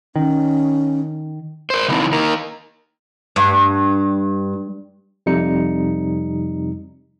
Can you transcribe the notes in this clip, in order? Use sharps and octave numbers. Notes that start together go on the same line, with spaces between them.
D#3 C#4
A#4 C5
C#3 E3 B3 C4 D#4
A#3 D#4 A#4
G2
F2 C3 G3 D#4 C#7